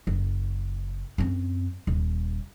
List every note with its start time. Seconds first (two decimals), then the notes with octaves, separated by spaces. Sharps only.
0.07 F#1
1.18 F#2 C4
1.87 D#1